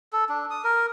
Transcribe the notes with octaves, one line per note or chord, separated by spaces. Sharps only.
A4
D4
D#6
A#4